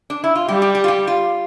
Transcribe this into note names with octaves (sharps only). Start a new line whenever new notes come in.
D4
E4
F4
G3 G4
G4
G4
F4
G4
F4